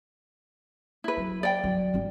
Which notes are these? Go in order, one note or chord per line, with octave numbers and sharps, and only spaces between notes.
E4 B4
F#3
D5 G5
F#3
G1 G#3